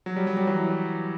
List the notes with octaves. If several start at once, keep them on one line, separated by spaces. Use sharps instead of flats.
F#3
G3
F#3
G3
E3 F#3